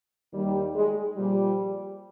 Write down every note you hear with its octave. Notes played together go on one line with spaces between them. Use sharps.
D#2 D#3 G3
G#3
A#2 F3 G3